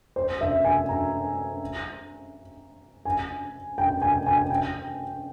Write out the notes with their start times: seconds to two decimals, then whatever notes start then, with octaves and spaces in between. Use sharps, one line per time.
0.16 C5
0.41 E5
0.65 G#5
0.89 A#5
3.05 G#5
3.78 G5
4.02 G#5
4.26 G#5
4.50 G5